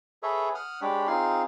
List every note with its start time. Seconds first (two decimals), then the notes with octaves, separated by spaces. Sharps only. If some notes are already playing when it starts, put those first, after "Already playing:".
0.23 G#4 A4 B4 C#5 E5
0.55 F#5 D#6 F6
0.82 G#3 D4 G4 C#5 B5
1.07 C4 D#4 F4 G#4 F5 C6